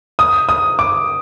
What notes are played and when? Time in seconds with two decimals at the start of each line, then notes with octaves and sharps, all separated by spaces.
0.19 D#6
0.49 D#6
0.79 D6